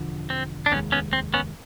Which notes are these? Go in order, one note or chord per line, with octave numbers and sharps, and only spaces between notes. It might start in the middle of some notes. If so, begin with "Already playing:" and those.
Already playing: E1 D3 F3
C4
D4
F1 D#2 D#3 G#3 B3 C#4
B3 C#4
C4
B3 C#4